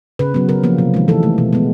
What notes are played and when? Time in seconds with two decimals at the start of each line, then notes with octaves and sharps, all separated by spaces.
0.19 C#3 B4
0.34 F#3 B3
0.49 C#3 A#4
0.64 F3 A#3
0.78 C3
0.94 D#3 G#3
1.08 E3 A4
1.23 A3
1.38 B2
1.53 G#3 B3